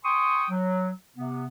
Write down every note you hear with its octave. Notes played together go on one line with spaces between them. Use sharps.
G5 G#5 C6 C#6 D#6
F#3
C3 B3